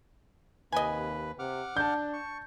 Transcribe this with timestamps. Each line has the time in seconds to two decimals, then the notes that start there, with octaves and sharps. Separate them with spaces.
0.72 D#2 C3 B4 D#5 G#5
1.39 C3 F#5 D6 F6
1.77 D4 A5 G6
2.13 C#6